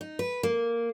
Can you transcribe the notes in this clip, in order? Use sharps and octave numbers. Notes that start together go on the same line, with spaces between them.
D#4
B4
A#3